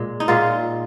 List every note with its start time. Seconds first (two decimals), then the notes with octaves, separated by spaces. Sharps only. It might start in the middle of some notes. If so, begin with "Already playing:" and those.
Already playing: A#2 G#3
0.20 D#4
0.28 A#2 G#3 F4